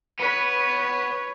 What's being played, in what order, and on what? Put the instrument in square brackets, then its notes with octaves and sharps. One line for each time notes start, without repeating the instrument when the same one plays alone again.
[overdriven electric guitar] B3 [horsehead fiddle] B4 C#5